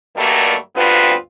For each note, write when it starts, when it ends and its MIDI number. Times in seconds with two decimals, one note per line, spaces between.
0.16 0.54 43
0.16 0.54 51
0.16 0.54 54
0.16 0.54 55
0.16 0.54 57
0.16 0.54 58
0.76 1.14 38
0.76 1.14 43
0.76 1.14 59
0.76 1.14 60
0.76 1.14 65
0.76 1.14 71